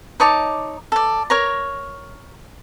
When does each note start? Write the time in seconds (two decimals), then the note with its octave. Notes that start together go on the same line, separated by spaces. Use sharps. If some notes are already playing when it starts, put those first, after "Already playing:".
0.20 D#4 C#5 A5 D6
0.92 A4 D5
1.30 A#4 C#5 A#5